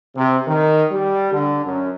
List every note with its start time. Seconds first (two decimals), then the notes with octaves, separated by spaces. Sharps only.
0.15 C3
0.47 D#3
0.91 G3
1.32 D3
1.63 F#2